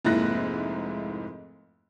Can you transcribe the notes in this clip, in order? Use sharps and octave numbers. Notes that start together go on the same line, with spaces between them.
F1 G#2 A#3 E4 F#6 A#6